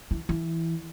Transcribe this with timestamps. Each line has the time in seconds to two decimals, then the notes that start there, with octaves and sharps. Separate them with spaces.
0.11 E3
0.29 E3